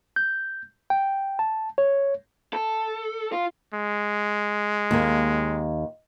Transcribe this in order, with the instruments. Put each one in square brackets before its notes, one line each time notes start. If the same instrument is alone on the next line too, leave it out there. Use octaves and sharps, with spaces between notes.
[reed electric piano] G6
G5
A5
C#5
[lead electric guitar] A4
F4
[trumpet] G#3
[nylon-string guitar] D#2 A#3